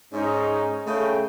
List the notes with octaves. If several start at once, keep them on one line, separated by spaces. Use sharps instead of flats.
G#2 C#4 D#4
C#3 A3 G5